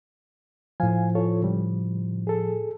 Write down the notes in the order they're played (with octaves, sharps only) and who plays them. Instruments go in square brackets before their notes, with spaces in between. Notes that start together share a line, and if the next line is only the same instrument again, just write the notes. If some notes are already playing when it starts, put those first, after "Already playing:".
[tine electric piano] A2 F3 [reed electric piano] F5 G#5
[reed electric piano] F4 A4 C#5
C#3 G3
G#4 A4